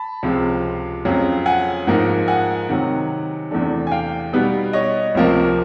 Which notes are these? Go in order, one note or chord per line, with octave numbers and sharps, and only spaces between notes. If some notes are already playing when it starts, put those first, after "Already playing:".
Already playing: A5 B5
C#2 C3 F3 G#3
F2 C#3 F#3
F#5 G#5
G#2 F3 A#3 D#4
F#5 G#5
C3 D#3 F#3
E2 C3 E3 A3 D4
G#5
F5 G5
B2 G3 B3 D#4
C#5 D#5
C#2 C3 F3 A#3